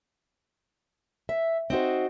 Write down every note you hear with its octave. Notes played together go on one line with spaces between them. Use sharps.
E5
C4 D#4 F#4 C5